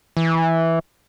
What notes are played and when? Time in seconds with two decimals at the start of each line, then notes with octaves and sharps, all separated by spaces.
0.17 E3